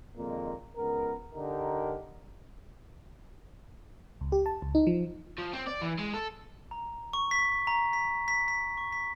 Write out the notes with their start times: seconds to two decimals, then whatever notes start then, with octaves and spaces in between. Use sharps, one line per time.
0.18 F2 A#2 D#3 G#3 A#3
0.77 C#2 B3 A#4
1.35 D3 D#4 G4 A#4
4.21 C#2
4.32 G4
4.46 A5
4.62 C#2
4.75 D#4
4.87 F3
5.38 F3
5.53 C4
5.67 D5
5.82 E3
5.99 G#3
6.14 A4
6.71 A#5
7.13 C#6
7.31 B6
7.67 A#5
7.93 B6
8.28 B6
8.48 B6
8.77 C#6
8.92 B6